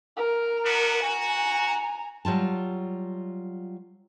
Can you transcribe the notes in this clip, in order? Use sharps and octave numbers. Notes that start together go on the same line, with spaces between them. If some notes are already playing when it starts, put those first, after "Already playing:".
A#4
B3 D4 F#4
F#4 G#5 A#5
F#3 G3 F4 A5